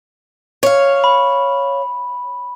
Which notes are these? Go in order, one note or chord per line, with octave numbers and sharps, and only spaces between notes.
C#5 F5
B5